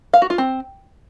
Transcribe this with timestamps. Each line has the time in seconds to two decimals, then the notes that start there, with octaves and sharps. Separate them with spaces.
0.13 F5
0.22 F#4
0.30 F4
0.38 C4